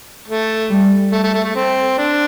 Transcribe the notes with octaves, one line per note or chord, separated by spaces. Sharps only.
A3
G3
A3
A3
A3
A3
C4
D4